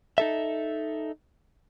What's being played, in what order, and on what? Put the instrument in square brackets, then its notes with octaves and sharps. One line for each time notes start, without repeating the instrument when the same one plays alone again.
[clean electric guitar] D#4 A4 E5